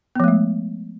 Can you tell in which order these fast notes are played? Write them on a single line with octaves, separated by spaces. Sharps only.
B3 F3 A3 G#3